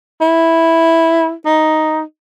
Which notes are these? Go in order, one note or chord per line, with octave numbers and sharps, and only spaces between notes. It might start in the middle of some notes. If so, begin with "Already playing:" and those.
E4
D#4